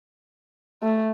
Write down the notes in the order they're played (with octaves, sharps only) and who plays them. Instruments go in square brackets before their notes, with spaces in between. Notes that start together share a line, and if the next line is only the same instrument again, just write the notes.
[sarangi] A3